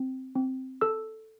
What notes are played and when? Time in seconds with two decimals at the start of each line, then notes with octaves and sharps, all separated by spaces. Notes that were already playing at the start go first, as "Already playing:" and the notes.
Already playing: C4
0.35 C4
0.81 A4 E6